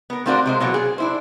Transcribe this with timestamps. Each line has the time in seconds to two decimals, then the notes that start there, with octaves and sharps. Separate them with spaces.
0.10 B3 A#4
0.26 A3 C4 F4 F#4 A#4 D5
0.46 C3 G#3 C5
0.60 B2 E3 F#3 A#3 F4
0.74 G#4
0.98 D4 E4 C5